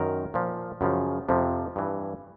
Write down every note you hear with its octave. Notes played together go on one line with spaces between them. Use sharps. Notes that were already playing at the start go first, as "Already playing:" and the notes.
Already playing: F#2 D#3 A#4
A#2 F3
F#2 C#3 F3
F2 C3 F3
G2 E3